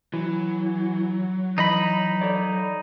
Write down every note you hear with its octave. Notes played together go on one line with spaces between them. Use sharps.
E3 F#3
E3 D#4 D#5 B5
A4 C#5 D5